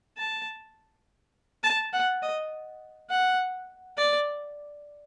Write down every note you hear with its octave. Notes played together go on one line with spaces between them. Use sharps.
A5
A5
F#5
D#5
F#5
D5